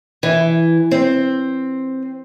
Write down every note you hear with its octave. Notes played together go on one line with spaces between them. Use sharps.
E3
C4